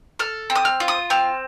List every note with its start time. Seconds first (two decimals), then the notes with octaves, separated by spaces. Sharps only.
0.19 A4 F6
0.50 C4
0.55 D#6
0.65 F6
0.80 F4
0.88 D#6
1.10 C4 F6